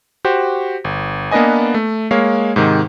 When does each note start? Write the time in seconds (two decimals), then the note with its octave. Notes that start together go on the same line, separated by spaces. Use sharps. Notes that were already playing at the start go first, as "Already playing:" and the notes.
0.25 F#4 G4 C5
0.84 G1
1.31 A#3 B3 D4 B4 D#5 G#5
1.74 A3
2.11 G#3 A#3 C#5 F5
2.56 G#2 C3 D#3